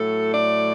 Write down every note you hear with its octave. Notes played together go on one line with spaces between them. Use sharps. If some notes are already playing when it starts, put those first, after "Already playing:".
Already playing: A2 F#3 A3 A4
D5